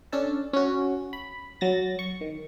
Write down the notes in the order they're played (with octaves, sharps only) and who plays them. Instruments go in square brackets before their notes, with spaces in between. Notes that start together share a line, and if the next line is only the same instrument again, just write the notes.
[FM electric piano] C#4 D4 A4 A5
C#4 F#4
B5
F#3 A6 A#6
C#6
D#3